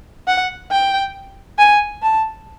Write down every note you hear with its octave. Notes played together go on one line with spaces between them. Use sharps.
F#5
G5
G#5
A5